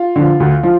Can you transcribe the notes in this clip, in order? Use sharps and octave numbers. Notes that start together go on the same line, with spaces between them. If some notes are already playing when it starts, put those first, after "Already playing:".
Already playing: F4
D3 F3
D2
F3